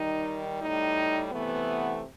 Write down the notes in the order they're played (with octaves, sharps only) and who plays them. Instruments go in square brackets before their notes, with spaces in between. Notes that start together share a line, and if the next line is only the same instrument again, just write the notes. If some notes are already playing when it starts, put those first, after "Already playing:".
Already playing: [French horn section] D#3 G3 D#4
A2 G3 D#4
C3 E3 A3 B3